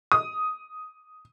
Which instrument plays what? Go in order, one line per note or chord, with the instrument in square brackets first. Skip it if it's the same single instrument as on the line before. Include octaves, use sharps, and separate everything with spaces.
[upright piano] D#6